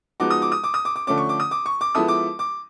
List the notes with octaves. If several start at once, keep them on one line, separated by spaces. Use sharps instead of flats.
F3 G#3 B3 D#4 F#4 D6
D#6
D6
D#6
D6
D#6
D6
D6
D3 F3 A3 C#4 D6
C#6
D6
D#6
D6
C#6
D6
F3 G#3 B3 E4 A4 D#6
D6
D6